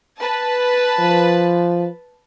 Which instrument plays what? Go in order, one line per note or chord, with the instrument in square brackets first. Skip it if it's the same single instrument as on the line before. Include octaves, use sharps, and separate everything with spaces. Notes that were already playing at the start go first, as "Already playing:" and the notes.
[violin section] B4 A5
[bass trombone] F3